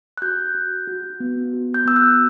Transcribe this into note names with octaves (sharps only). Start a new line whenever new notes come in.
F#6
F#4 G6
F#4
F#4
B3
F#4
G6
B3 E6
F#6